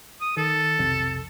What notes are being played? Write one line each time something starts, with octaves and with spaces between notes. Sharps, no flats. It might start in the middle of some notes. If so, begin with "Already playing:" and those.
D#6
D#3 A4
B1 F2 C3